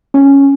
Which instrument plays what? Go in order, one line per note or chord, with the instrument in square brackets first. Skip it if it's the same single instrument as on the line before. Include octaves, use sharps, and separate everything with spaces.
[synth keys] C#4